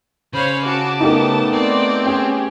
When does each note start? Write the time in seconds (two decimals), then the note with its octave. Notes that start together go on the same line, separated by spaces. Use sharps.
0.33 C#3 C5 C#5 F5 B5
0.64 F#4 A5 D6
1.00 A3 B3 D#4 G4 A#4
1.53 C4 D5
2.05 C#4 G4 G#4 G5